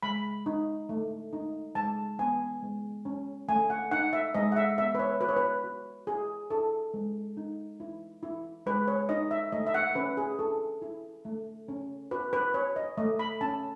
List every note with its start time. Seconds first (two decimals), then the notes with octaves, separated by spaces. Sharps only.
0.03 G#3 B5
0.46 D#4
0.89 A3
1.33 D#4
1.75 G#3 A5
2.19 B3 G#5
2.62 G#3
3.05 C#4
3.48 A3 G#5
3.70 F#5
3.91 D#4 F#5
4.13 E5
4.34 G#3 D#5
4.52 F#5
4.56 E5
4.78 B3 E5
4.95 B4
4.99 C#5
5.21 F#4 B4
5.29 C#5
5.37 B4
5.64 F#4
6.07 E4 G#4
6.50 E4 A4
6.94 G#3
7.37 D#4
7.80 E4
8.23 E4
8.66 G#3 B4
8.88 C#5
9.09 D#4 D#5
9.31 E5
9.52 A3 D#5
9.66 E5
9.74 F#5
9.95 C#4 B4
10.17 G#4
10.39 E4 A4
10.82 E4
11.25 A3
11.68 C#4
12.11 F#4 B4
12.33 B4
12.54 F#4 C#5
12.76 D#5
12.98 A3 D#5
13.19 B5
13.41 C#4 A5